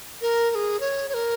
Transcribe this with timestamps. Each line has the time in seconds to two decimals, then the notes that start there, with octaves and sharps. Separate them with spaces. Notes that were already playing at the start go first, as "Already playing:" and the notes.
0.21 A#4
0.51 A#4
0.55 G#4
0.80 C#5
1.09 C#5
1.14 A#4